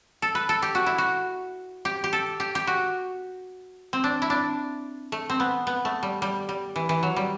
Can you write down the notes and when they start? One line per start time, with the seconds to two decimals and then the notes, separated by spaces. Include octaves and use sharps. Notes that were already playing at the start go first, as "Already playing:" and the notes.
0.22 A4
0.35 B4
0.49 A4
0.62 G4
0.75 F#4
0.86 E4
0.98 F#4
1.85 G4
2.04 G4
2.13 A4
2.40 G4
2.55 G4
2.67 F#4
3.93 C4
4.04 D4
4.22 E4
4.30 D4
5.12 A3
5.30 C4
5.40 B3
5.67 B3
5.85 A3
6.03 G3
6.22 G3
6.49 G3
6.76 E3
6.89 E3
7.03 F#3
7.16 G3